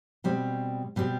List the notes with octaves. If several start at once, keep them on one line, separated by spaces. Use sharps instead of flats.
B2 G3 C4
B2 G3 C4